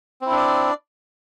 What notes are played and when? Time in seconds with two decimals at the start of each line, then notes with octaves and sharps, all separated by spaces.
0.22 C4
0.26 E4
0.31 D4
0.36 D5